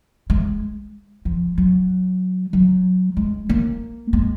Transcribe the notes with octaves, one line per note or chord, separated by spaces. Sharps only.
G#3
F3
F#3
F#3
G#3
A#3
G#3